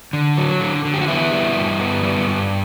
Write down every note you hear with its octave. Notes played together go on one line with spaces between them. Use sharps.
D3
F#3
D3
D3
G4
F#4
B3 E4
G3
G2
B3
G3
G2